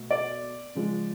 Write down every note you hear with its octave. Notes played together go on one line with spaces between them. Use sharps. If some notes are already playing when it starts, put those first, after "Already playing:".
Already playing: B2 A3
D5
C#3 F3 G#3